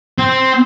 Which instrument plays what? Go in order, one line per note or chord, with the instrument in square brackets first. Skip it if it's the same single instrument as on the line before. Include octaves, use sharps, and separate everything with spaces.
[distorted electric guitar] C4